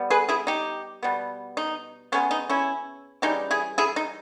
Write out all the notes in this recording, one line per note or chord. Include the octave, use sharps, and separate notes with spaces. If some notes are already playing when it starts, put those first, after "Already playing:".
Already playing: G3 B3
G#4 B4
E4 G#4
D#4 G4
B2 G3 B3
D#4
C#3 G#3 B3 C#4
D#4
C#4 E4
C#3 E3 G3 D#4 G4
E4 G#4
E4 G#4
D#4